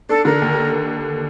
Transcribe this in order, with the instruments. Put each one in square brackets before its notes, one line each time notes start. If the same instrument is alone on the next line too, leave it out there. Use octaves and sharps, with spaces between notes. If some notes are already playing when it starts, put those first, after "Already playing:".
[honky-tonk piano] D4 [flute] A4
[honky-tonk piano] D3 [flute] A#4
[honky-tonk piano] D#2